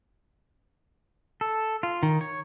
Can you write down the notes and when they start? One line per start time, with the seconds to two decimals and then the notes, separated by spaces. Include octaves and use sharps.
1.41 A4
1.83 F4
2.03 D#3
2.21 C#5